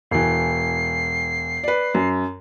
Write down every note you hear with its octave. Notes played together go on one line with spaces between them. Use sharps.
E1 E3 C7
B4 D5
F#2